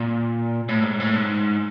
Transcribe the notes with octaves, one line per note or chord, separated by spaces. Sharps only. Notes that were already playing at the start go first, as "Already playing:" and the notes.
Already playing: A#2
A2
G#2
A2
G#2